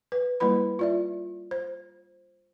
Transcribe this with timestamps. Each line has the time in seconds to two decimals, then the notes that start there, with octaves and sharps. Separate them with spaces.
0.12 B4
0.40 G3 A#3 E4 B4 B5
0.79 F4 D5 E5
1.51 C5